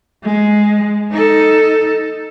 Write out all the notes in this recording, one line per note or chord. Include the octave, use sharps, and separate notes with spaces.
G#3
D#4 A4